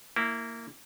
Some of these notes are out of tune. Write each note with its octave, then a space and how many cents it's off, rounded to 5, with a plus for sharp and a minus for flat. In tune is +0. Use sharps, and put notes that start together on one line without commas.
A#3 -15 E4 +0